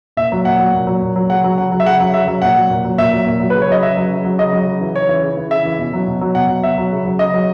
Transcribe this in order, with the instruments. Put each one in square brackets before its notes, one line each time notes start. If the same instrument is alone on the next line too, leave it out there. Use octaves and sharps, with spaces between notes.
[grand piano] A#2 E5
F#3
A#2 F#5
F#3
A#2
F#3
A#2
F#3
C#3 F#5
F#3
C#3 F#5
F#3
E5
C#3 F#5
F#3
C#3 E5
F#3
A#2 F#5
F#3
A#2
F#3
A#2 E5
F#3
A#2
F#3
C#3 B4
C#5
F#3 D#5
C#3 E5
F#3
C#3
F#3
C#3 D#5
F#3
C#3
E3
C#3 C#5
E3
C#3
E3
C#3 E5
E3
B2
F#3
B2
F#3
B2 F#5
F#3
B2 E5
F#3
C#3
F#3
C#3 D#5
F#3